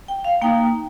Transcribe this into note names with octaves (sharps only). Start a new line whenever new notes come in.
G5
F5
A#3 D#4 G5